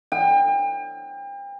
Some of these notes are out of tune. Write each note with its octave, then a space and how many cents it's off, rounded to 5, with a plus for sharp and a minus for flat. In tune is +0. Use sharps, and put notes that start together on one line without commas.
G5 +35